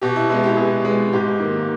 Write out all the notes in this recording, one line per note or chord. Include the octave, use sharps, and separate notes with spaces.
B2 G4
E4
G#3 B3 E4
G4
B2 G#4
G#3 B3
G#2 G4
D#3 A#3